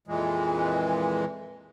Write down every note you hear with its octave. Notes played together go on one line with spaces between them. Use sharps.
F2 A#2 E3 G#3